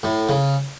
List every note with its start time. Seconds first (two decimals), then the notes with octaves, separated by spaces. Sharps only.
0.03 A2
0.29 C#3